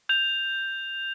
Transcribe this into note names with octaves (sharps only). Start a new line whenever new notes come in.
G6 F7